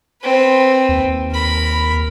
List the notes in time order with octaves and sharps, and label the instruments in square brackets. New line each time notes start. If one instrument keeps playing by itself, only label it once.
[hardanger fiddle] C4 B4
[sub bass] D#2
[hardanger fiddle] A#4 B5